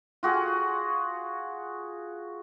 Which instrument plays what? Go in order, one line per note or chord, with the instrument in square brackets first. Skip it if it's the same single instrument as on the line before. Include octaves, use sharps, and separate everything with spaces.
[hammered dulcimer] F4 F#4 G#4